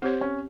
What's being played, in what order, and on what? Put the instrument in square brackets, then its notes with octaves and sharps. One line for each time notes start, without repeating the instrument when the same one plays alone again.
[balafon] C4 G4 C#5 [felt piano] C5
[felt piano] C#4